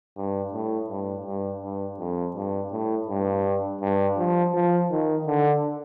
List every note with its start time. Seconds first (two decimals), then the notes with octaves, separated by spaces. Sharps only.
0.17 G2
0.53 A2
0.90 G2
1.26 G2
1.62 G2
1.99 F2
2.35 G2
2.72 A2
3.08 G2
3.81 G2
4.18 F3
4.54 F3
4.91 D#3
5.27 D3